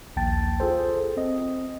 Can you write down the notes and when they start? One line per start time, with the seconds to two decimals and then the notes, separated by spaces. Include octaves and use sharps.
0.16 A#1 D#2 G5 A5 A6
0.60 F4 G#4 A4 C5
1.17 C4 D#5